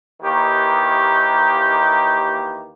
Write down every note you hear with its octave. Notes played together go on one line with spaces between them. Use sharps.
D#2 D#3 E3 A#3 G4